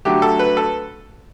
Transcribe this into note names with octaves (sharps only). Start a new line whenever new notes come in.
D3 F#3 A3 G4
A4
B4
A4